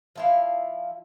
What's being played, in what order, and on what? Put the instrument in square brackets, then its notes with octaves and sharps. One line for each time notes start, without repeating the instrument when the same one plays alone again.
[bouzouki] F3 E4 F5